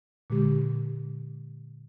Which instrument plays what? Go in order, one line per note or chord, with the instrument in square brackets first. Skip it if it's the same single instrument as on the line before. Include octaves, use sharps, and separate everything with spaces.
[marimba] A#2 D3 G#3 G4